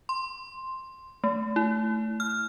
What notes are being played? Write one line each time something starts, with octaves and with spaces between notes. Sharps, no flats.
C6
A3
E4
F6